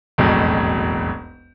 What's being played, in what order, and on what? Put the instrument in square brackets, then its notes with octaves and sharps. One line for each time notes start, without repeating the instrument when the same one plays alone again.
[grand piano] E1 B1 F2 A2